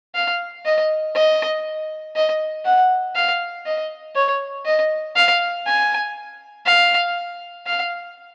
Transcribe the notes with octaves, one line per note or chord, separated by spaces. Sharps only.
F5
D#5
D#5
D#5
F#5
F5
D#5
C#5
D#5
F5
G#5
F5
F5